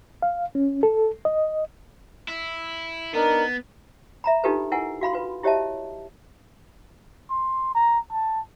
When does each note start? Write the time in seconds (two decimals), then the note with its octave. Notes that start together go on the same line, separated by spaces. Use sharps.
0.22 F5
0.55 C#4
0.83 A4
1.25 D#5
2.28 E4
3.14 B3 D4 D#4 A#4
4.24 E5 A#5 B5
4.44 D4 D#4 F4 G4 A4 B4
4.72 E4 A#4 F#5 G#5
5.01 F#4 F5 B5 C6
5.13 F4 B4
5.43 E4 G4 C#5 D#5 E5 A5
7.30 C6
7.75 A#5
8.11 A5